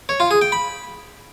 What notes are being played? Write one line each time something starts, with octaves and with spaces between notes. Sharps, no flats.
C#5
F4
G#4
G5
B5